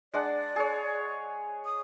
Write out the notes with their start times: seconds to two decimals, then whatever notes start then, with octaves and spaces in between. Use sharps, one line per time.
0.14 G#3 D4 D5 F#5
0.56 G#4 C#5
1.65 D#6